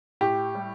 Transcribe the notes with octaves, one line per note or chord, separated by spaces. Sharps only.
A2 G4
G3